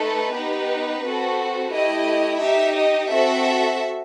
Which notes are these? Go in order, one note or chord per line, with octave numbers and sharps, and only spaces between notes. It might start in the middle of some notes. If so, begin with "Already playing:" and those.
Already playing: A3 D#4 A4 B4
B3 D#4 G4
C4 F#4 A4
A3 E4 G4 D#5
D#4 G4 E5
D#5
C4 F#4 A4 E5